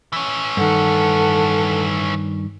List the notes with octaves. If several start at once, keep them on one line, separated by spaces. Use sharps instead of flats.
E3 C#4
G2 D#3 A4 F#5